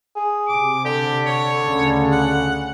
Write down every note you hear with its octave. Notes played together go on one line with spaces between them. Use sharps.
G#4
C3 D6
D3 G4
C#5
D2 C#3
F#5